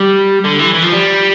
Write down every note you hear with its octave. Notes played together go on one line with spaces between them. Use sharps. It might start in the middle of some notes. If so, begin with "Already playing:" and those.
Already playing: G3
D3
E3
E3
F3
G3